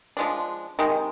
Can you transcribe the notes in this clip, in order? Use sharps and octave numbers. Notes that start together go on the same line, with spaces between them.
F3 G#3 D4
C3 D#3 G#3